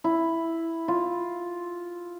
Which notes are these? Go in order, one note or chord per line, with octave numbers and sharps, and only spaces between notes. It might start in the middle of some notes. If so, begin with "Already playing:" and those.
E4
F4